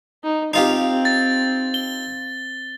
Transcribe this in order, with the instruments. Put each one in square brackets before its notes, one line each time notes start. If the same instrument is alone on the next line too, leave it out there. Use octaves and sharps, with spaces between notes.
[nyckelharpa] D#4
[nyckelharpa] C4 [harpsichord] D#4 F4 G4
[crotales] A6
G7